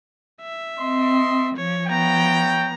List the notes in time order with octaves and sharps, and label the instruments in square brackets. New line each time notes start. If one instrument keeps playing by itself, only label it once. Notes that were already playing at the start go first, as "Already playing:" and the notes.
[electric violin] E5
[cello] C4 [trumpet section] D#5 C6
[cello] F3 [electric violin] C#5
[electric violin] B3 A#5 [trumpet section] C#5 E5 G5